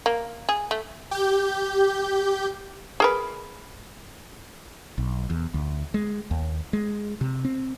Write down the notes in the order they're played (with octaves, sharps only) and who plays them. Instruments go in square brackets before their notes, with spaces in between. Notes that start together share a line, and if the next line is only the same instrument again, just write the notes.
[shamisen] A#3
G#4
A3
[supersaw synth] G4 G6
[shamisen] G#4 A#4 B4
[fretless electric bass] B1
E2
D2
G#3
D#2
G#3
C3
C4